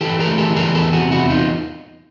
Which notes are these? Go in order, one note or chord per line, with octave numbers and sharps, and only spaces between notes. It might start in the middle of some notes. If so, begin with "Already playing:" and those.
E3 G4 A4
G#4 A#4
A3
G4 A4
E3
G#4 A#4
E2 G4 A4
F#4 G#4
C3
E4 F#4
E2
D#4 F4